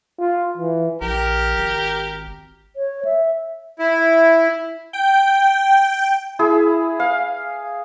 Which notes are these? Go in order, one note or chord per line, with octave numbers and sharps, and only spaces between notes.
F4
E3
A#1 G4 A#4
G#1
C#5
E5
E4
G5
E4 G#4
F5